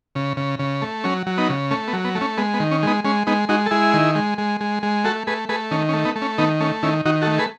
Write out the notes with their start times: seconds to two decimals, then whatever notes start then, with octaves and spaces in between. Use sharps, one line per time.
0.15 C#3
0.37 C#3
0.59 C#3
0.82 A3
1.04 F#3 C#4
1.27 F#3
1.38 B3 D#4
1.49 C#3
1.71 A3 C#4
1.88 B3
1.93 F#3
2.04 B3
2.15 A3
2.21 C#4
2.37 G#3 B3
2.54 B3
2.60 D#3
2.71 C#4
2.83 G#3 B3 D#4
3.04 G#3 C#4
3.27 G#3 B3 D#4
3.49 G#3 D#4 F#4
3.66 A4
3.71 G#3 E4 G#4
3.94 D#3
4.15 G#3
4.38 G#3
4.61 G#3
4.83 G#3
5.04 A3 F#4 A4
5.27 A3 G#4 B4
5.49 A3 G#4 B4
5.71 D#3 C#4
5.89 C#4
5.93 A3
6.05 B3 D#4
6.16 A3
6.22 C#4
6.38 D#3 B3 D#4
6.60 A3 C#4
6.83 D#3 C#4 E4
7.05 D#3 D#4 F#4
7.22 F#4 A4
7.27 A3
7.38 G#4 B4